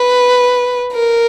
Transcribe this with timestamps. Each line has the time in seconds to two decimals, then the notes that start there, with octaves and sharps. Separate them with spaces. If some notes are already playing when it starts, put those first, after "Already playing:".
Already playing: B4
0.93 A#4